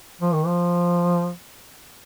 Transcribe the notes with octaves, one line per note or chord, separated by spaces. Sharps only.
F3
D#3
F3